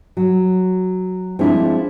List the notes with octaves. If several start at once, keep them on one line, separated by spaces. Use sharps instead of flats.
F#3
F3 G#3 C4 D4 E4